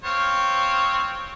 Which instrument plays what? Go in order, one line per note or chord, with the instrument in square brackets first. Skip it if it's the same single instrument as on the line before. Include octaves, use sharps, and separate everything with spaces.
[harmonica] C4 C#5 F5